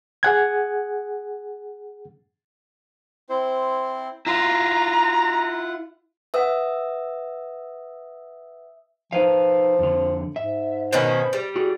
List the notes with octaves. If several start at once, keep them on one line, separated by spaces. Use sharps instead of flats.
G#4 F#5 G#6
C4 E4 C5
E4 F4 F#5 A#5
B4 E5 F#5 D#6 E6
F3 D#4 B4 F5
F2 D3
G#2 E5
B2 D#3 C#4 B4 C5
G3
F#4 G#4